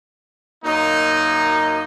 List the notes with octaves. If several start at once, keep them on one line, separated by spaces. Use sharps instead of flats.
F#2 A#3 D#4